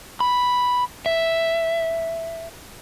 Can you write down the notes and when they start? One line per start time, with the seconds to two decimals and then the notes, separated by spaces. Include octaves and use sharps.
0.20 B5
1.06 E5